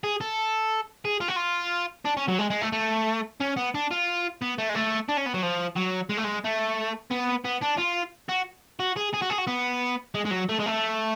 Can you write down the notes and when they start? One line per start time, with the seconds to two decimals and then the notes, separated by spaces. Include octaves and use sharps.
0.04 G#4
0.21 A4
1.05 G#4
1.21 F4
1.28 F#4
1.36 F4
2.05 D4
2.17 C#4
2.28 F#3
2.39 G#3
2.50 G#3
2.61 A3
2.72 A3
3.40 C#4
3.57 B3
3.75 D4
3.91 F4
4.42 B3
4.58 A3
4.70 G#3
4.75 A3
5.09 D4
5.17 C#4
5.26 B3
5.34 F#3
5.43 F3
5.76 F#3
6.09 G#3
6.17 A3
6.24 G#3
6.44 A3
7.11 B3
7.45 B3
7.62 D4
7.79 F4
8.29 F#4
8.80 F#4
8.96 G#4
9.14 G#4
9.22 F#4
9.30 G#4
9.38 F#4
9.47 B3
10.15 G#3
10.25 G#3
10.31 F#3
10.49 A3
10.59 G#3
10.66 A3